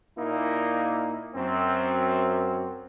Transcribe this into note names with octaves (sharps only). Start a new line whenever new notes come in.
A#2 A#3 D#4 E4
F#2 C4